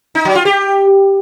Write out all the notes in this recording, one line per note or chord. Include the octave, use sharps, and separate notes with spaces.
D#4
F#3
F4
G4